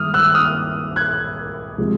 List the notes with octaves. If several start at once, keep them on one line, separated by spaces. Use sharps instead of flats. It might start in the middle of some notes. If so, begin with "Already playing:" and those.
Already playing: G2 D#3 G#3 D#6 F6
E6 F#6
D#6 F6
F#6 G#6
C3 F3 G#3